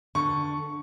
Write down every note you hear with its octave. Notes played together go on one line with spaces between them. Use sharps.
D3 C#6